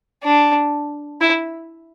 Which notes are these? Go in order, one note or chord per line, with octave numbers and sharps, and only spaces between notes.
D4
E4